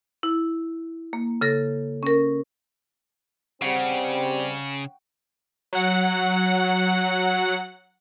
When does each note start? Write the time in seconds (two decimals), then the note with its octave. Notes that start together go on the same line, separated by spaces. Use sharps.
0.23 E4
1.13 A#3
1.41 C#3 A4 A#6
2.03 C#4 A#4
3.62 C#3 G3 C4 F#5 G5 C#6
5.73 F#3 F#5